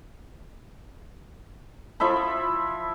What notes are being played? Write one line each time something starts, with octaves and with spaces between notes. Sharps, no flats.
F3 E4 E5 B5